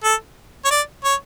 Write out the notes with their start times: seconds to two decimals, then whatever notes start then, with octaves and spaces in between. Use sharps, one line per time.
0.04 A4
0.65 C#5
0.71 D5
1.04 C#5